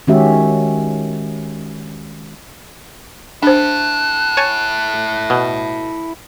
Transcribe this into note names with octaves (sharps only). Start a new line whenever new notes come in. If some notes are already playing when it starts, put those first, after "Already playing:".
D#3 G#3 C#4 F#4 G4 E5
D4 E4 A4 C5 F#6
C#5 G#5 A5
B2